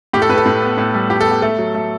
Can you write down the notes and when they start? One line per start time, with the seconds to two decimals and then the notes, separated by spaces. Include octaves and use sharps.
0.13 A2 G4
0.22 A4
0.29 A2 B4
0.37 A4
0.46 A2
0.62 B3
0.78 A2
0.94 G3
1.10 A2 G4
1.21 A4
1.27 B3 G4
1.42 A3 A4
1.58 F#3
1.75 A3